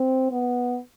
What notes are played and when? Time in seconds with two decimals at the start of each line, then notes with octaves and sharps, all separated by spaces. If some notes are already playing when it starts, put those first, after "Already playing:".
Already playing: C4
0.31 B3